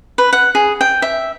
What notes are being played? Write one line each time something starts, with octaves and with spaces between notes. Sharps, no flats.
B4
F#5
G#4
G5
E5